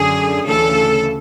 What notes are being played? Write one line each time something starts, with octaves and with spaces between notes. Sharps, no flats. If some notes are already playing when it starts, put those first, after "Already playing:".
Already playing: F#2 D3 G#4
D2 C#3 E3 A4